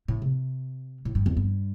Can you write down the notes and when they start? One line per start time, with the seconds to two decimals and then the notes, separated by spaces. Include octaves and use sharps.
0.08 A2
0.22 C3
1.05 A2
1.15 G2
1.26 E2
1.37 G2